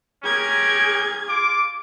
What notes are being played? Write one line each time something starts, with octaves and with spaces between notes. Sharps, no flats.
C#4 G4 G#4 A#4 G#6
F4 D6